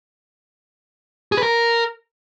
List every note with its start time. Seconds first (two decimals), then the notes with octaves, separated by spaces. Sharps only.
1.32 G#4
1.37 B4
1.43 A#4